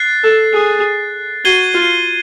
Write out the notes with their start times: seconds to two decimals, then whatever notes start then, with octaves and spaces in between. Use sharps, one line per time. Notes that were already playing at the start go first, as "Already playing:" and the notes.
Already playing: F#6 A6 C7
0.24 A4
0.54 G#4
1.44 F#4 G#6 C7 D#7 G7
1.75 F4